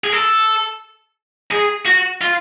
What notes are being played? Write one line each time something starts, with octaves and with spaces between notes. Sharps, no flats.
G#4
A4
G#4
F#4
F4